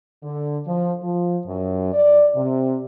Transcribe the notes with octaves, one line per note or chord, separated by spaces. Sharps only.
D3
F3
F3
F#2
D5
C3